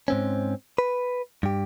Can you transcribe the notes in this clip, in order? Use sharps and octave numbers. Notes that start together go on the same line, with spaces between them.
G#2 C4 C#4
B4
G2 G4